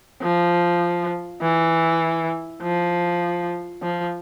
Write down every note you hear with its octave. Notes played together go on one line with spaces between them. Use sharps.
F3
E3
F3
F3